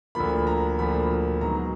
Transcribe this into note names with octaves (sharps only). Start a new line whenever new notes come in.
D2 D3 F3 A#3 B5
A#5
D2 D3 F3 A#3 B5
G#2 F#3 B3 A#5